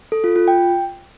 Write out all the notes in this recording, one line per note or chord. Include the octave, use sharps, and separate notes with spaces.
A4
F4
F4
G5